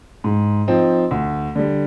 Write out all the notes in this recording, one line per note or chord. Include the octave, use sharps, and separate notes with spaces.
G#2
F3 C4 D#4
D2
D3 G3